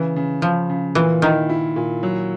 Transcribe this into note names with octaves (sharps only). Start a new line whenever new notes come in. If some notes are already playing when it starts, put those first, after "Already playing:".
Already playing: C#3 E3
C#3
C#3 F3
C#3
A#2 E3
D#3 E4
E4
A#2
F#3